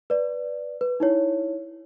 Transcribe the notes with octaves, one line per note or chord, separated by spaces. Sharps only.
B4 D5
B4
D#4 E4 C#5